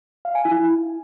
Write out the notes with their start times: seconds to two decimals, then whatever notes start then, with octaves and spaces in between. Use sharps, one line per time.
0.25 F5
0.35 G#5
0.45 E4